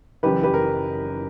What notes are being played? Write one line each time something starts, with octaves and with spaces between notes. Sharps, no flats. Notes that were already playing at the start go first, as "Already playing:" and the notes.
F#1 F#2 E3 G4 B4
G4 B4
A#4